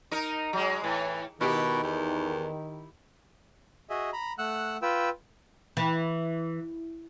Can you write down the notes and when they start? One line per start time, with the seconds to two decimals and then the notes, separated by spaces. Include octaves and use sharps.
0.11 D#4 A#4
0.53 F#3 G#3
0.84 A2 E3
1.41 B2 D#3 E4 G4
1.83 E2
3.89 F#4 G#4 D#5 E5
4.13 A#5 B5
4.38 A3 F#5 E6 F#6
4.82 F4 B4 G5 E6
5.77 E3